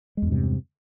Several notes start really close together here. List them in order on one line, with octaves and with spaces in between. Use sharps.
G#3 E2 G2 C3